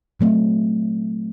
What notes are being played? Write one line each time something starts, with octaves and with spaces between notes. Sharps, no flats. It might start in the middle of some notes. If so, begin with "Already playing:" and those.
A#2 F#3 A3 C4